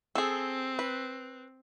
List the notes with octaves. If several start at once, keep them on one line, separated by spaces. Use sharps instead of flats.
C4 G#4 A4
B4